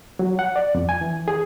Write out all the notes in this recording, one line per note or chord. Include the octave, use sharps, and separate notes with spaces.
F#3
F#5
D5
F2
G#5
E3
G#4